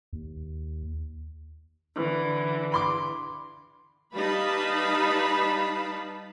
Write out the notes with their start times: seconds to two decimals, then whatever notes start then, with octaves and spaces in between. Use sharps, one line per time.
0.13 D#2
1.94 D3 E3
2.72 B5 C6 D6
4.16 G3 D#4 B4 F5 A5 B5